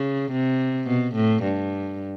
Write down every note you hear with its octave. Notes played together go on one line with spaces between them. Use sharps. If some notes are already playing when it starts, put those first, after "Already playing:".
Already playing: C#3
C3
B2
A2
G2